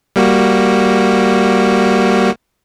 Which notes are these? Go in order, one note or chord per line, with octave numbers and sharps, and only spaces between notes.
G3 A#3 F#4